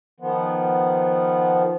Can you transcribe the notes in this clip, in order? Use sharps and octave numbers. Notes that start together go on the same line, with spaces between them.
D#3 F3 B3